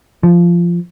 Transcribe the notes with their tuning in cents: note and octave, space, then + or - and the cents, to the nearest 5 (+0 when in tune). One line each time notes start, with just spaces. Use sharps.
F3 -15